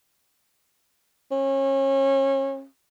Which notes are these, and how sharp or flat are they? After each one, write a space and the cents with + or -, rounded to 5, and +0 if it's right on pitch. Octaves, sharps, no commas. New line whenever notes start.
C#4 -30